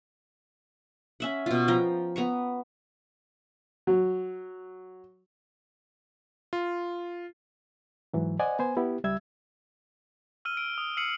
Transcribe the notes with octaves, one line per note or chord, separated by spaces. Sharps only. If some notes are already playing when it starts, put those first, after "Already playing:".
C#4 E5 F#5
B2 F4
F3 G5 A#5
B3 A#5 C#6
F#3
F4
G#2 E3 F#3
C5 D5 D#5 F#5 G#5
B3 C5 G#5
B3 E4 G4
C#2 G3 E5 E6 G#6
E6 F6 D#7 G7
D7
D#6
E6 F6 C7 C#7 D#7 F#7